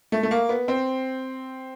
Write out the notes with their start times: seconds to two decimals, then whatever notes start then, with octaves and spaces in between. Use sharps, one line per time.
0.12 A3
0.23 A3
0.31 A#3
0.49 B3
0.68 C4